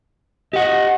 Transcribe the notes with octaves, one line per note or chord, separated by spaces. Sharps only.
G4 D#5 F#5